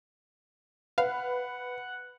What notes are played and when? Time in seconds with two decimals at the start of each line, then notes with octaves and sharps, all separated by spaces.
0.98 B4 F5 F#5